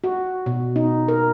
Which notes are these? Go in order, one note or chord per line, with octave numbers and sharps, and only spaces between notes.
F#4
B2
D#4
A#4